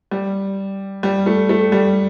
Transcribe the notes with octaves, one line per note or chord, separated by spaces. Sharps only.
G3
G3
A3
A3
G3